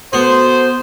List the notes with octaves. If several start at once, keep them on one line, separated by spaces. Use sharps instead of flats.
B3 F#4 A4 C5